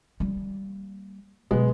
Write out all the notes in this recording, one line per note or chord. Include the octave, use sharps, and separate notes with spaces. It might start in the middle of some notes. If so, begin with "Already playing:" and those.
G3 A#3
B2 F#3 G#3 B3